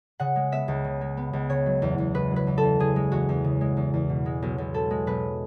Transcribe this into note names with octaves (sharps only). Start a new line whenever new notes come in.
C#3 F#5
G#3
B3 E5
C#2
C#3
G#3
B3
C#2
C#3 C#5
F#3
E2
E2
C#3 B4
F#3
B4
E2
A4
E2
C#3 G#4
G#3
E2 F#4
E2
C#3
G#3
E2
E2
B2
G#3
B1
B1
B2 A4
G#3
B1 B4